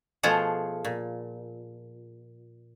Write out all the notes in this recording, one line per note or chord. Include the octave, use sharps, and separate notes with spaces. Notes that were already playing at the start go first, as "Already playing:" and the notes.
B2 F3 A3 F4 G#4 F#5
A#2